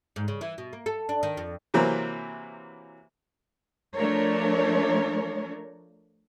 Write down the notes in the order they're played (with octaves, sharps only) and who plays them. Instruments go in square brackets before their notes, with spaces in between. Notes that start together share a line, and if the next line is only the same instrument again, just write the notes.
[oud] G#2
C#3
E3
B2
A#3
A4
D4
D#3
F2
[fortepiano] C3 E3 F#3 A#3 C4
[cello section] F3 A3 D4 A#4 C#5